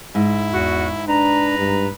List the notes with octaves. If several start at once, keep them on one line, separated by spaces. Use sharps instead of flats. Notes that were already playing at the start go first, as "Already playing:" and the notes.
G#2 E4
E2 F#4
D4 B4 A#5
G2